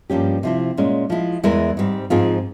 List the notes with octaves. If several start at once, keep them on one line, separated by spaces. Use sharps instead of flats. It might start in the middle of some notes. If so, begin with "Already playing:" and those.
G2 F3 A#3 C#4 G4
C3 F3 C4 E4
A#2 G#3 C#4
F3 G#3 E4
E2 E3 G#3 E4 A#4
G#2 G3 C4
G#2 F3 C4 F4 G#4